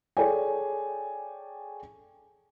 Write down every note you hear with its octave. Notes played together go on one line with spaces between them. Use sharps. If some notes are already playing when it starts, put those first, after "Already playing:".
G#4 A4 C#5 D5 G5 G#5